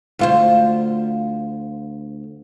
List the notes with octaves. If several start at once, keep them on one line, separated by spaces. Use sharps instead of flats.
D2 F4 C5